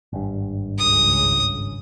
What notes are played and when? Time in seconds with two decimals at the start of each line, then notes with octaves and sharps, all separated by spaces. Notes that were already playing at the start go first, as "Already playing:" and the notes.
0.13 G#1 G2
0.79 C#2 C#3 D#6